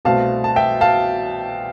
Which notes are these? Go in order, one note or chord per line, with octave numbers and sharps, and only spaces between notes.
C2 B2 A3 C4 F5 A5
A5
E5 G5
F5 A5